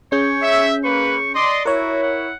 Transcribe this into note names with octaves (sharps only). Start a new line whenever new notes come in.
C#4 G#4 C#5 G6
E5
A#3 B4 C#6
D5 D#5 C6
E4 F#4 A#4 C#5
F#5